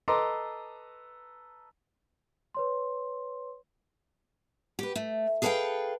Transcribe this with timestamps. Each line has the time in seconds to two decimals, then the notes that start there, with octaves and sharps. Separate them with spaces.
0.08 A4 B4 D#5 A#5 C6 D6
2.54 B4 C#5 C6
4.79 G4 B4
4.96 A3
5.42 G#4 A4 B4 C5 F5 G5